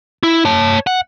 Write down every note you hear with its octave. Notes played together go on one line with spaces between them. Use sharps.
E4
C#5 A5
F#5